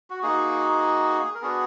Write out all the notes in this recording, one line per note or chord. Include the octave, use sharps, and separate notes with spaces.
F#4
A#3 D#4 F#4 G#4
A#4
B3 D4 F#4 G#4